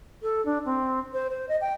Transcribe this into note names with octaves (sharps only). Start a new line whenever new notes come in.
A4
D4
C4
C5
C5
D#5
G5